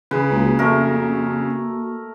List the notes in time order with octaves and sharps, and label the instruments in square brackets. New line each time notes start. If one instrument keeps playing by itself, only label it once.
[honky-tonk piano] C#3 [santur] B4
[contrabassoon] C#2 [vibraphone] A#3 F#4
[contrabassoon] F2 [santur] A3 A#4